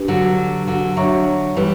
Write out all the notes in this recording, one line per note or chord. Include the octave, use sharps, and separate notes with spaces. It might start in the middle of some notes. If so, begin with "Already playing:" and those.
Already playing: D4 G4 B4
D3 F#3
D3 F#3
D3 F#3 C#5 E5 A#5 C#6
E3 G3